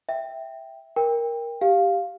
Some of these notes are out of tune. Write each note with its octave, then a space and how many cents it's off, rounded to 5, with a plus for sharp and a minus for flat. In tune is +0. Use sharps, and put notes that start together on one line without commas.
E5 +0 G5 +0
A#4 +10 G5 +25
G4 +0 F5 +0